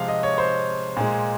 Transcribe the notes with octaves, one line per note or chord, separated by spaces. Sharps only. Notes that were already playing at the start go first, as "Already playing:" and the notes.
Already playing: C3 F3 G#3 F5
D#5
C#5
C5
A#2 G#3